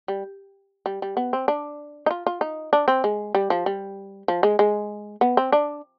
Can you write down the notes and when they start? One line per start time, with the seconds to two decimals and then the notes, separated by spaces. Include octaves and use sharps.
0.08 G3
0.86 G3
1.02 G3
1.17 B3
1.33 C4
1.48 D4
2.06 D#4
2.11 F4
2.27 F4
2.41 D#4
2.73 D4
2.88 C4
3.04 G#3
3.35 G3
3.50 F3
3.66 G3
4.28 F3
4.43 G#3
4.59 G#3
5.21 B3
5.37 C4
5.52 D4